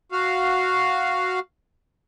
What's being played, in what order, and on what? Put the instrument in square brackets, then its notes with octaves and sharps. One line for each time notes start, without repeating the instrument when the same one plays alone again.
[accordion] F#4 F5